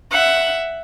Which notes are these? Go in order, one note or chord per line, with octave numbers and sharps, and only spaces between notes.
E5 F#5